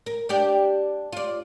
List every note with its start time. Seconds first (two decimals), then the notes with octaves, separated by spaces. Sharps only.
0.06 A#4
0.29 D4 G4 D5
1.12 F4 D5